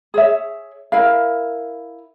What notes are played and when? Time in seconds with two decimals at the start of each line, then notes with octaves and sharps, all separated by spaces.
0.14 G#4 C#5 E5
0.92 E4 A#4 F5